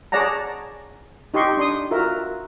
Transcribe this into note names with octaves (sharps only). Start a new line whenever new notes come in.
G#4 C#5 D5 F#5 A5 A#5
D#4 G4 D#5 C6 C#6
D4 C6 D#6
F4 F#4 A#4 E5